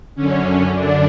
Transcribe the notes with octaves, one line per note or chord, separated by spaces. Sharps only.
F#2 D3 C#4
D3 D4